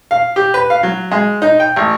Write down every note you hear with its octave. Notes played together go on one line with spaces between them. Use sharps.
F5
G4
B4
F5
F#3
G#3
D#4
G5
A1